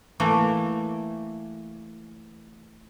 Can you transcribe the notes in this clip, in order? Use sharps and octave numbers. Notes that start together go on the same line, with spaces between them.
E3 A3 A#3